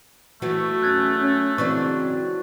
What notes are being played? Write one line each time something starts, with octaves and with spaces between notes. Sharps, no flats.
E3 F#3 A3 B3 F#4
E2 C#4 F#6 G#6 A6
C#4
G#2 C#3 E3 F#3 C4 D4 C#6